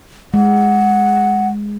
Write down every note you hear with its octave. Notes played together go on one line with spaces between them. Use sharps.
G#3 F#5